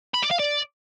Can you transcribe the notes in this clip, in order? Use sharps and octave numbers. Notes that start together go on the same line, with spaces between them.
B5
D5
F5
D5